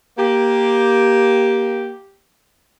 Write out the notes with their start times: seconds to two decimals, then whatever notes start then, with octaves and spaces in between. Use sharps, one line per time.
0.18 A#3 G4